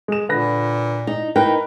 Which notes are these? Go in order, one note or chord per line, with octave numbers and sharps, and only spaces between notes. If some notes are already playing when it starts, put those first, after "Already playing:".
G#3 E7
A#2 D3 B4 A#6
D#4
D#4 E4 A#4 B4 G5